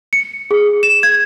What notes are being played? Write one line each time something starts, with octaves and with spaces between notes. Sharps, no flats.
C#7
G#4
E7
G#6